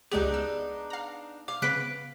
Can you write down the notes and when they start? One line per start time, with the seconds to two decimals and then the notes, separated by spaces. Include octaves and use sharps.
0.12 C#2 G#3 B3 D4 D#4 G4 G#4
0.34 E6
0.90 F5 A#5
1.48 F5 D6
1.62 C#3 B3 B4 F#6 B6 D7